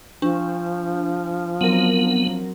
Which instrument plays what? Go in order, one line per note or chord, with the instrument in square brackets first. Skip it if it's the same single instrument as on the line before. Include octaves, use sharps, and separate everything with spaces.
[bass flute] F3 [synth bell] D4
[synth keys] F#3 C4 A#4 [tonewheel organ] B3